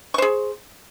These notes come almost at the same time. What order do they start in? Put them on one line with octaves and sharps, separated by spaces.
C#6 C5 G#4